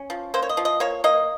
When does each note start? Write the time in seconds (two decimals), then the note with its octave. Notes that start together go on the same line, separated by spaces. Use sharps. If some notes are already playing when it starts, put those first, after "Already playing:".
Already playing: C#4
0.10 F3
0.34 A#3 C5
0.42 C#5
0.49 D#5
0.57 F3
0.65 D#5
0.80 A#3 C#5
1.04 A#3 D#5